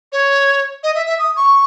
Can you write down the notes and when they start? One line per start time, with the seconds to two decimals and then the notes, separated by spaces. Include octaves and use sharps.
0.12 C#5
0.83 D#5
0.95 E5
1.06 E5
1.19 D#6
1.36 C#6